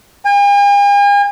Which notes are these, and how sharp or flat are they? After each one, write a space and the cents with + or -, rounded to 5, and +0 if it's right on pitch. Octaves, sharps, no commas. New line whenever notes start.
G#5 -45